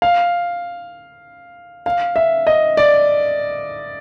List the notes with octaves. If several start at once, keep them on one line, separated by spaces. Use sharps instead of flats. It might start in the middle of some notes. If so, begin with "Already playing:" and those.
F5
F5
E5
D#5
D5